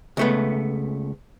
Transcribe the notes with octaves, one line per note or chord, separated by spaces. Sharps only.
C#2 A3 B3